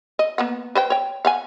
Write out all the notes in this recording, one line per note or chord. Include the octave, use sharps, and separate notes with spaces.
D#5
A#3 B3 F#5
B4 C5 G5
C#5 G5
F5 F#5 G#5